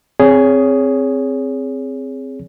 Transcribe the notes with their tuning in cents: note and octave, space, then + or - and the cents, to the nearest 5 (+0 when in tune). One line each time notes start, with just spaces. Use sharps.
C4 +5 G#4 +0 C#5 +25